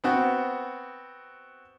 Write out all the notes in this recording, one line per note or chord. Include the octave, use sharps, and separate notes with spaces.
B3 C4 F#4